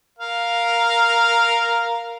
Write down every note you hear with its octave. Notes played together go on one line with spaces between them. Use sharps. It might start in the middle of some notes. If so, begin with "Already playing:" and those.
A#4 F5